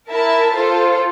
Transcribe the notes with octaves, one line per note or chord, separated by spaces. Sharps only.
E4 A#4 E5 A5
F4 A4 C5